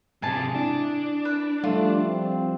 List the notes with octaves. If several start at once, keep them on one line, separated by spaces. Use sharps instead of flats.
G#2 C3 G#4 G#5 A5
D4 E4
B4
F3 G3 A3 F4
C4